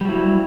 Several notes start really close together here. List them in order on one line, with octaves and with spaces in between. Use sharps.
G3 F#3 E4